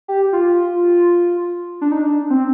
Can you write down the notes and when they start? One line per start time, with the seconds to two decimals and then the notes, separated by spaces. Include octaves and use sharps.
0.08 G4
0.33 F4
1.81 D4
1.92 D#4
2.01 D4
2.30 C4